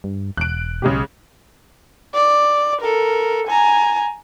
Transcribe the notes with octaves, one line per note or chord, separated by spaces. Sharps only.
G2
E1 F#6 D7
B1 C#3 G#3 G4
D5
A4 A#4
G#5 A#5